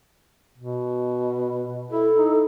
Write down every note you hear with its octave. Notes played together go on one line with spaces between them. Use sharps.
B2
E4 A4
D#4